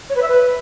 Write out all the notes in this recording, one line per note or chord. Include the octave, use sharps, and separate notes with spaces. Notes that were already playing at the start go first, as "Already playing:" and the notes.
C#5
B4
E5
B4